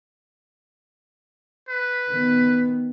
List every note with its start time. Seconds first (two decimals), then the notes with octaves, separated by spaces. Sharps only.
1.69 B4
2.09 D#3 B3